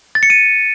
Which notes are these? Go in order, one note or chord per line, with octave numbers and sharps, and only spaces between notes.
A6
C#7
D#7